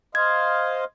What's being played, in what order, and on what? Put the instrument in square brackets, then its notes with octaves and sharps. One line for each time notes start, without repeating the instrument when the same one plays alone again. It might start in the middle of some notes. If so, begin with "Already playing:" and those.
[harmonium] C5 D#5 F5 [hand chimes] G#6